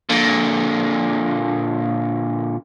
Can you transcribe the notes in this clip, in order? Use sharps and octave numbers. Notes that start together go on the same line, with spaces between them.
A#2 D3